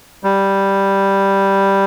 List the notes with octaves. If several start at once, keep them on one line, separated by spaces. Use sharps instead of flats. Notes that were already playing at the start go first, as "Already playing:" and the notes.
G3